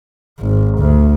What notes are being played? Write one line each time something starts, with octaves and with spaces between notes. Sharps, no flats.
G#1
D2